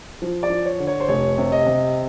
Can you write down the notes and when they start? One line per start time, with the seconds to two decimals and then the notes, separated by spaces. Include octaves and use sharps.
0.22 F3
0.43 D5
0.50 F3
0.66 C#5
0.79 D3
0.87 C#5
1.00 C5
1.09 F1 C#5
1.38 C3
1.52 D#5
1.67 C3